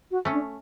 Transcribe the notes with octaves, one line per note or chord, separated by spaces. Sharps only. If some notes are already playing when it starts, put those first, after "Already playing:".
F#4
A3 C#4
D4